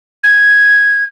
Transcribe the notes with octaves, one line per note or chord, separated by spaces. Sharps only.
G#6